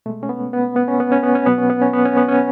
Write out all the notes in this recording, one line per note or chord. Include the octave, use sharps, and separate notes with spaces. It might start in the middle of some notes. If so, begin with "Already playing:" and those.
B2 G#3 A3
C#4
B3
B3
B3
C#4
B3
C#4
B3
C#4
B2 F#3 B3
C#4
B3
C#4
B3
C#4
B3
C#4